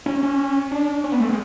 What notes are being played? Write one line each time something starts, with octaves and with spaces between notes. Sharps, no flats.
C#4
C#4
D4
C#4
B3
A3
G#3